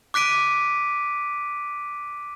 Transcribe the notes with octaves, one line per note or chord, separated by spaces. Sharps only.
D6 F#6 B6 D7 D#7